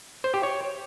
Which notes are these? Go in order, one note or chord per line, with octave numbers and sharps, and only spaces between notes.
C5
G4
C#5